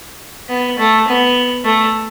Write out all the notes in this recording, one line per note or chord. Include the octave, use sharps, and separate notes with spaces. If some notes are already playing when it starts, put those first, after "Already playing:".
B3
A3
B3
A3